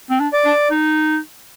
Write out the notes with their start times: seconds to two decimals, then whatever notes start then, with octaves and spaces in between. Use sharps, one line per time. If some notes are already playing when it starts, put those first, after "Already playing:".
0.10 C4
0.20 D4
0.33 D5
0.45 D4
0.71 D#4